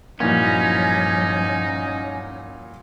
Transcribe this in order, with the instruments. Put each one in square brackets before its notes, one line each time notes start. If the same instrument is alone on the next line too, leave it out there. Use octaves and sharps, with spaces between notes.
[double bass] G2 F3 [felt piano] A#2 F#3 E4 [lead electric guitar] C#4 [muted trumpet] D#4